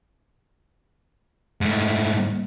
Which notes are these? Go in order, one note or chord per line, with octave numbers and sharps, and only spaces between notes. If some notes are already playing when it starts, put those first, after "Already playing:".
G#2 A3